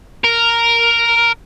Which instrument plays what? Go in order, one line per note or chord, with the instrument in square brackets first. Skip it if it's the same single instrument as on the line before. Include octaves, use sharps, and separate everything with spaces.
[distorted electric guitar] A#4